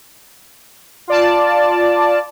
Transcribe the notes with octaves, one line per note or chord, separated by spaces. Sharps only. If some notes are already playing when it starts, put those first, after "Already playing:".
F4 D5 A5